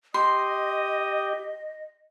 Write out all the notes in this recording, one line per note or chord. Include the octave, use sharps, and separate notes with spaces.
G4 D#5 C6 D#6